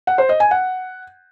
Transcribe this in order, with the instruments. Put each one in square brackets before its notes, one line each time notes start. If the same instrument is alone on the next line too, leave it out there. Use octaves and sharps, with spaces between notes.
[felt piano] F#5
C5
D#5
G#5
F#5